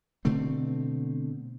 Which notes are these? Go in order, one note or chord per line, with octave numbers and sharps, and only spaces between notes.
B2 D3 A3 C4